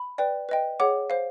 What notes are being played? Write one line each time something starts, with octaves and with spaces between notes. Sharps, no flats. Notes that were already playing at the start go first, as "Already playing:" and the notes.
Already playing: B5
B4 D5 G5
B4 D#5 G5
G#4 C#5 F#5 D6
C5 F5